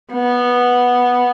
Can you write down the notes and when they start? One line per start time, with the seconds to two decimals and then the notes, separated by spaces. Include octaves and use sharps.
0.12 B3